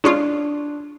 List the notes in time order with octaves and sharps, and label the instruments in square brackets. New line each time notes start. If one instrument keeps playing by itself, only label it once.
[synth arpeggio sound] G#3 C#4 F4 [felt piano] D4